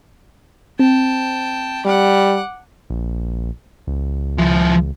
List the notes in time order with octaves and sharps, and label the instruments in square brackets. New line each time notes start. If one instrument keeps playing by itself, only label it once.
[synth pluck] C4 [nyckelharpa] G5 A5
[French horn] G3 [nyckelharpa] F#5 D6
[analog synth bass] A#1
C#2
[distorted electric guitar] F3 E4